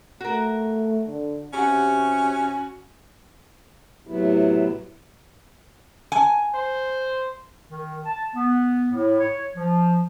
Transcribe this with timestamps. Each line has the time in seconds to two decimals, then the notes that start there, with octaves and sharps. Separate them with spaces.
0.21 A3 F#4 A#4
1.07 D3
1.54 C3 C#4 F#4 G4 F#5
4.07 A2 C3 F#3 B3 E4
6.12 G#5
6.54 C5
7.70 D#3
8.06 A5
8.35 B3
8.92 A2
9.20 C#5
9.56 F3